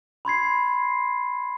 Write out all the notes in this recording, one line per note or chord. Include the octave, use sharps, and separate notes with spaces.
B5 C6 G#6 C7